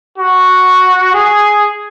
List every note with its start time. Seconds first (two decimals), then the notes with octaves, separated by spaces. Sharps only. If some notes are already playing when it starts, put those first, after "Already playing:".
0.18 F#4
1.14 G#4